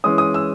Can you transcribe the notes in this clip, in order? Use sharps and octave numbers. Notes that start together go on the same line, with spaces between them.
E3 G#3 C#4 D#6
D#6
E6